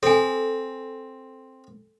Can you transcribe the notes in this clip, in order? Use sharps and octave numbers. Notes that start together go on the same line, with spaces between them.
C4 A4 G#5